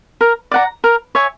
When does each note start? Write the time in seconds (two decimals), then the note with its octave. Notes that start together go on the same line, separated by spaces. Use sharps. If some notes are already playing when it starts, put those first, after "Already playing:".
0.21 A#4
0.51 D5 F#5 A#5
0.84 A#4
1.15 C#5 E5 G#5